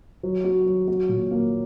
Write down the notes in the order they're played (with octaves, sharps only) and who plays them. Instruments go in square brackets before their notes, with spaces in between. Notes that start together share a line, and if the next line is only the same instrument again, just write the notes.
[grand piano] F#3
F#4
F#3
F#4
A#2
A#3